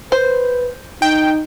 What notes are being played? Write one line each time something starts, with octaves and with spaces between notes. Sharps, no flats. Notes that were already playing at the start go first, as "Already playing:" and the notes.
B4 C5
D#4 G5